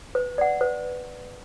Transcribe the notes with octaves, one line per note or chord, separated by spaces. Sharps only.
B4
D5 F#5
B4